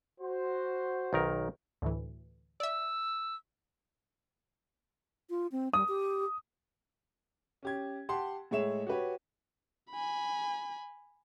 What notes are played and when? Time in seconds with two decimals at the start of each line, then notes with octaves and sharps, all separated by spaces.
0.20 F#4 C5
1.13 B1 D#3 A#4
1.82 D2 A2 E3
2.60 D5 E5 E6
5.30 F4
5.52 C4
5.73 G3 D#6
5.88 G4
7.63 C#4 G4 G#6
8.09 G4 F#5 A5 C6
8.51 A2 G#3 G#4 C#5 E5 E7
8.87 F#4 G4 B4 C#5
9.91 G#5 B5